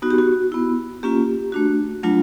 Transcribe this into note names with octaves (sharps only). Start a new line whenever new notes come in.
B3 D#4 F#4
G4
F#4
B3 E4
A#3 C#4 F4 G4
A3 D4 F#4
F#3 A3 D4 F4